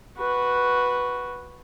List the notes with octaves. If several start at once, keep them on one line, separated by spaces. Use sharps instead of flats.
F#4 B4